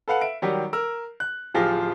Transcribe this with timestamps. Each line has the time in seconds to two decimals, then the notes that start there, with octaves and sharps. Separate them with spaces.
0.08 A4 B4 F5 F#5
0.21 E5 D7
0.42 D#3 F#3 G3 G4
0.73 A#4 E6
1.20 F#6
1.54 D1 F3 F4 G4 G#4 A#6